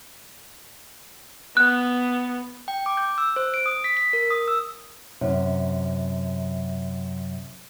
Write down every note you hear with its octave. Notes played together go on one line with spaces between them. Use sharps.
B3 F#6
G5
D6
G6
E6
C5
D7
D#6
B6
B6
A#4
D#6
E6
F#2 C3